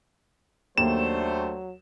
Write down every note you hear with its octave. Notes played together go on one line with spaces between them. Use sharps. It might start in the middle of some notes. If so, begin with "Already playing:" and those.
D#2 F#3 A3 D4 C5 E7